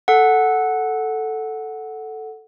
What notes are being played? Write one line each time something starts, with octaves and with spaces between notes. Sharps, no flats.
A4 F#5